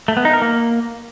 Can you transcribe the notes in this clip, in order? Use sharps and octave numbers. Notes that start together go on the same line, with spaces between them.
A3
B3
D#4
A#4
A#3